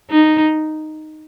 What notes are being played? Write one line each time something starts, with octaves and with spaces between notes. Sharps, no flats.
D#4